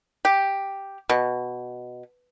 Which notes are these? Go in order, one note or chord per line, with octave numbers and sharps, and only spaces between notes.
G4
B2